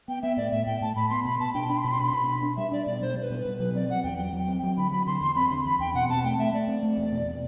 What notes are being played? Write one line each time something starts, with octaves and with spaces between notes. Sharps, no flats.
B3 G5
B3 E5
A2 D5
A2 E5
A2 G5
A2 A5
A2 B5
B3 C6
B2 B5
B2 A5
D4 G5
D4 B5
C6
B2 B5
C6
D4 B5
C6
B2 B5
D4
D4
G3 E5
D4 D5
B2 D5
G3 C5
G3 B4
B2
B4
B2
F#3 B4
C4 D5
F#3 F#5
E2 G5
F#3 G5
F#3 G5
C4
G5
F#3
D3 B5
F#3 B5
D3 C6
E2 C6
C4 B5
D3 C6
E2 B5
E2 G5
B2 F#5
C4 A5
A3 G5
A3 E5
A3 D5
C4
A3
E2
B2
B2